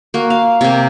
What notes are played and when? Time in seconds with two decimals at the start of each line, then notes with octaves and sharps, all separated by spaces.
0.14 A#3 F#4
0.30 F5
0.61 C3 A#3